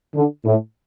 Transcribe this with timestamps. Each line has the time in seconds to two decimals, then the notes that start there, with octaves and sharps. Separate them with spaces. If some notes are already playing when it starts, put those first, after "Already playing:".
0.15 D3
0.45 A2